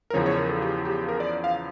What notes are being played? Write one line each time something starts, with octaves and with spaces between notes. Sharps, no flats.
A#4
E2 C#3 F3 C#5
C#5
A#4
A4
G4
G4
A#4
D5
F5